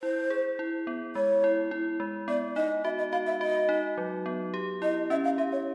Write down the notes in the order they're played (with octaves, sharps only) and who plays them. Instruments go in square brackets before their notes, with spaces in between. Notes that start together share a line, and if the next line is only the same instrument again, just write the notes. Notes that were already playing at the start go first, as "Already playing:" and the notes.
[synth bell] E4 [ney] C5
[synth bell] G#4
E4
B3
[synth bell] G#3 [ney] C#5
[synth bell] E4
E4
G#3
[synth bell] B3 [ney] D5
[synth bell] D#4 [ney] D#5
[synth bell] F#4 [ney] E5
[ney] D#5
[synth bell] F#4 [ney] F5
[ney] E5
[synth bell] F#4 [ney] D#5
[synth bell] D#4
F#3
B3
G4
[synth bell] E4 [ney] D#5
[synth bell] C#4 [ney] E5
[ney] F5
[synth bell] G4 [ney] E5
[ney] C#5